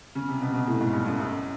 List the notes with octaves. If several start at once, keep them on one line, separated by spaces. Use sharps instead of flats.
C#3
C3
B2
B2
A2
G#2
G2
F#2
F#2